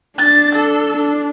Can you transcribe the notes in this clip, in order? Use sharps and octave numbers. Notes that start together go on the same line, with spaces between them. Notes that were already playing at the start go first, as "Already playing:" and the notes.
D4 A6
A4
D4